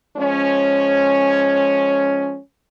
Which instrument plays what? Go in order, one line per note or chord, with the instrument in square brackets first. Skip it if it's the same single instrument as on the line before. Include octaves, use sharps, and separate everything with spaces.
[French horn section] F3 G#3 C#4